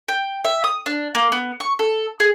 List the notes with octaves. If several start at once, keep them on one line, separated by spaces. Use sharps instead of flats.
G5
E5
D#6
D4
A#3
B3
C#6
A4
G#4